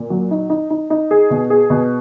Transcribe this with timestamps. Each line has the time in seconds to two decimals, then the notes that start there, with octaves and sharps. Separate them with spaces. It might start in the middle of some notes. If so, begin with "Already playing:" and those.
Already playing: A#2
0.10 F#3
0.31 D#4
0.50 D#4
0.70 D#4
0.90 D#4
1.11 G#4
1.30 B2
1.50 G#4
1.70 B2